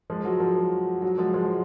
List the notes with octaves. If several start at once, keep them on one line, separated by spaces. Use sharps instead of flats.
F3 G#3
F#3
F3
F#3
F3 G#3
F3 G#3